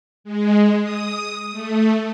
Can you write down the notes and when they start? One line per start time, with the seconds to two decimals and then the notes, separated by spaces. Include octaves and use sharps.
0.24 G#3
0.81 D#6
1.52 A3